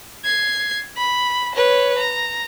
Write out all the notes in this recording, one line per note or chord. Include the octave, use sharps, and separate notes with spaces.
G#6 C7
B5
B4 C#5
A#5